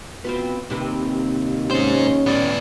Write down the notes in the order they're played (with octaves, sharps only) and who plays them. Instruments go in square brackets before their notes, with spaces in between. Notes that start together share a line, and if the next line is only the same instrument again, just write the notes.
[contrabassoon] B2 [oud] C4 F4 B4
[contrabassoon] D#2 [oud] C3 C4 B4
[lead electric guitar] G#2 C5 [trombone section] C#4
[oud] A2 G3 [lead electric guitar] B3 D5